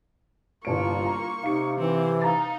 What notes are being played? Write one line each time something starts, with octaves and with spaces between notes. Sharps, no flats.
G1 C2 A#3 F4 C#6 D7
A#5 C6
C3 D#4 F5 C#7
E3 C4
D#4 F5 A#5 A6